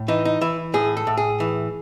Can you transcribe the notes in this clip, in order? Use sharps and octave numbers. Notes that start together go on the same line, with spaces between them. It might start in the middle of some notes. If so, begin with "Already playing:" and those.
Already playing: A2
E3 D#4
D#4
E3 E4
A2 G#4
A4
A2
G#4
E3